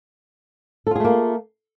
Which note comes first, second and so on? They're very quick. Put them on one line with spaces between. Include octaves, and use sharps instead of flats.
A4 F4 G#4 A3 A#3